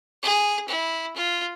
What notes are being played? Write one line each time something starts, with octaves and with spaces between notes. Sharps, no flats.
G#4
E4
F4